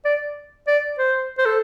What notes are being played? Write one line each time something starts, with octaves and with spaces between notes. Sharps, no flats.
D5
D5
C5
C5
A4